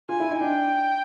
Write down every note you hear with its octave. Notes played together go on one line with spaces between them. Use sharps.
F4 G#5
E4
D#4
D4 G5